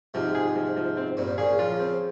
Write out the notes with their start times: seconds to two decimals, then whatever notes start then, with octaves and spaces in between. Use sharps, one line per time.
0.14 G#2 C3 F3
0.35 G#4
0.56 F3
0.76 F3
0.97 C4
1.17 G2 A#2 C4
1.38 A#2 C#3 G#4
1.58 C#3 F3 F4
1.79 C4